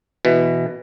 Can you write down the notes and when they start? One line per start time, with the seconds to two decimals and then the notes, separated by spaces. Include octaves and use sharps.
0.25 B2 E3